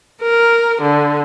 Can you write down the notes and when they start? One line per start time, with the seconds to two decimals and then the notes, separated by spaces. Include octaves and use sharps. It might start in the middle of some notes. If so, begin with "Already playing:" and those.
0.22 A#4
0.82 D3